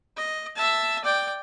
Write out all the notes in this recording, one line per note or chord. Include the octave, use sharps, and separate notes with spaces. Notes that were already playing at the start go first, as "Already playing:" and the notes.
D#5
E5 A5
D5 G5